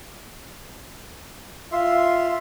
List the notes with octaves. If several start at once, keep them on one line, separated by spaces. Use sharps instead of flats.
F4 E5 C6